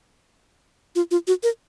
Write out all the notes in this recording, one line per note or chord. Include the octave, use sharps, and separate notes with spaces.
F4
F4
F#4
A#4